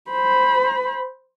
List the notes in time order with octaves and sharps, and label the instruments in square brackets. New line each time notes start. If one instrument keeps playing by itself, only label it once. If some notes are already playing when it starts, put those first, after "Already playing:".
[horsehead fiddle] C5 B5